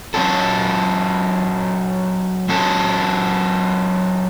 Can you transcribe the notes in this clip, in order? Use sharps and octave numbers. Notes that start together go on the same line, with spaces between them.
F#3 C#4 F#4 A4
F#3 C#4 F#4 A4